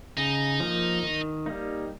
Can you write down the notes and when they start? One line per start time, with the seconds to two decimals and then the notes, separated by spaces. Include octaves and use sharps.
0.17 C#3 D#4
0.60 F3 A#3
1.03 D#3
1.46 G3 A#3 D#4